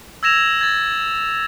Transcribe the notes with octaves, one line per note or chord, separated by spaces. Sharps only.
E6 G#6 A#6 E7 F7
G#6 A6